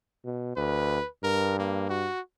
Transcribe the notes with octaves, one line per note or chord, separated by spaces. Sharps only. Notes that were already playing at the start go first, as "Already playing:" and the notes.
B2
D2 B4
G2 A#4
A#3
F#4